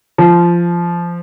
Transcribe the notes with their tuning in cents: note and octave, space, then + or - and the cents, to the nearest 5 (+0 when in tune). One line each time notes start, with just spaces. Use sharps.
F3 -15